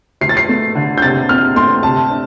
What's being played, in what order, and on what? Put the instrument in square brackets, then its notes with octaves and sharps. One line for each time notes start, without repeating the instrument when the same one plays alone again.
[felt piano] D2 [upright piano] C7
[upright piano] A6
C7
[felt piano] A3
D3
[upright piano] G6
[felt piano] C3 [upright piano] A6
[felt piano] C4 [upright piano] F6
[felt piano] A3 [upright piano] C6
[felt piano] C3 [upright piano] A5
[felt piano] D4